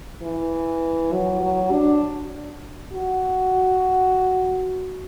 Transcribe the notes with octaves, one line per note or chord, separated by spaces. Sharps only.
E3
F#3
F#3
D4
F#4